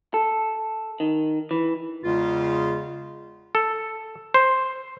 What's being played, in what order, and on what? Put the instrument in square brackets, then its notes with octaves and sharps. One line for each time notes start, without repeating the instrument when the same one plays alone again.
[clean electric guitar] A4
D#3
E3
[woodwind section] E2 C#3 G#3 F4
[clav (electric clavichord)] A4
C5